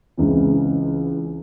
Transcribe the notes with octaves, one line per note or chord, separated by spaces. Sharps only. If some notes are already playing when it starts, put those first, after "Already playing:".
C#2 C#3 E3 C4